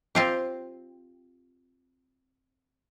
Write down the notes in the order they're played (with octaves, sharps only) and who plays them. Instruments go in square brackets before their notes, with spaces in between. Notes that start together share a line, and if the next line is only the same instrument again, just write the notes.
[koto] C4 F4 G4